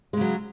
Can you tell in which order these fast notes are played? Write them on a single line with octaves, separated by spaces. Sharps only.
G#3 C#3 F#3